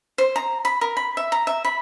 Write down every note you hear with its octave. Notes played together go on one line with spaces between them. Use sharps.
C5
A#5
B5
A#4
B5
E5
A#5
E5
B5